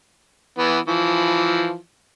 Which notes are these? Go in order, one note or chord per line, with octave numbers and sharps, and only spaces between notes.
E3 B3
E3 F3